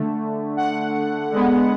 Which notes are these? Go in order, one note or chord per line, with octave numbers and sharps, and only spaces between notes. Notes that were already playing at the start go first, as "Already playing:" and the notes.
Already playing: D3 A3
F#5
D3 G#3 B3